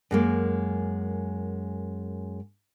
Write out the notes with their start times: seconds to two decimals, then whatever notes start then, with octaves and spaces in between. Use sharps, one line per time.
0.11 F#2 G#3 A#3